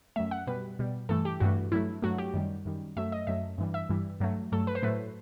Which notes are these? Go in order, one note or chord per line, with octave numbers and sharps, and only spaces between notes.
F#2 F#3 A3 E5
F#5
B2 G3 B4
B2 G3
G2 E3 A3 A4
G4
G2 E3 A3 F#4
G2 F#3 A3 E4
G2 F#3 A3 F#4
G4
F#2 D#3 G3
F#2 D#3 G3
F#2 F#3 A3 E5
D#5
F#2 F#3 A3 E5
G2 E3 G3
E5
G2 E3 G3
G2 F#3 A3
G2 F#3 A3 A4
B4
C5
A2 F#3 A3 B4